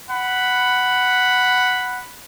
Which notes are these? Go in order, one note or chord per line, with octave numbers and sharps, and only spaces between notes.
F#5 B5